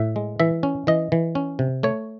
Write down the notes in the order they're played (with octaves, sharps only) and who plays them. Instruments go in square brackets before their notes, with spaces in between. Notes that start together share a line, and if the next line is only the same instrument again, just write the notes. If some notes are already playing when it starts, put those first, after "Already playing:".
Already playing: [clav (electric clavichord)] A2 E5
G#3
E3 E5
C#4
E3 D#5
E3
C#4
C3
A3 C#5